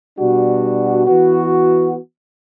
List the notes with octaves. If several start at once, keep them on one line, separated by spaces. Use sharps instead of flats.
B2 G3 D4 F#4
E3 B3 F#4